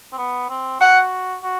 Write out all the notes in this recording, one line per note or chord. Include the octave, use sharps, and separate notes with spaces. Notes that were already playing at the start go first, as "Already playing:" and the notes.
C4
B3
C4
F#4 F#5
F#4